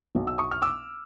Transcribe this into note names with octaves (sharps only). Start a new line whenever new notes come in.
B1 B2 F#3
E6
C#6 D#6
F6
D6 E6